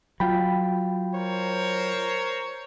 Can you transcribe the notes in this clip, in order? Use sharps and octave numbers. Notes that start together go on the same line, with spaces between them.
F#3 F4 G5 B5
A#4 C5 C#5